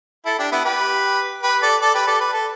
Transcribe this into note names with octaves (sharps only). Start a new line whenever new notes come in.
E4 A4
D4 G4
B3 E4
G4 B4
G4 B4
A4 D5
A4 D5
G4 B4
A4 D5
B4
A4